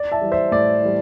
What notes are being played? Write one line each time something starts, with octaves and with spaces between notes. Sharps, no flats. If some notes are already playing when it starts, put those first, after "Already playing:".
Already playing: D5
E5 A5
E3 G3
C5 E5
A2 D5
E3 G3